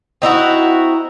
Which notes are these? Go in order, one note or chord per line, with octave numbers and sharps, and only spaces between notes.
C4 D#4 E4 F#4